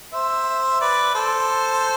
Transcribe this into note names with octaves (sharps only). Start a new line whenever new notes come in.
C5 E5
B4 D5
A4 C5